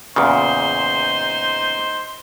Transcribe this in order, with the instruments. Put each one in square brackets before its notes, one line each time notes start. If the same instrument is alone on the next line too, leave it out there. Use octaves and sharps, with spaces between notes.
[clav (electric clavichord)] E2 A#2 C#3 [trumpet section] D#4 C5 C6